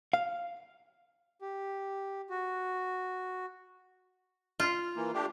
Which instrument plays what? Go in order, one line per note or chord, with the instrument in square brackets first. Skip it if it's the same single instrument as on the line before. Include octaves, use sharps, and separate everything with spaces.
[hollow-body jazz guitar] F5
[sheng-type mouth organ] G4
F#4
[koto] F4
[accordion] E3 A#3
A3 D4 G4